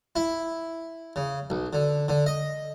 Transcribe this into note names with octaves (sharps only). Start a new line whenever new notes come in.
E4
C#3
B1
D3
D3
D#5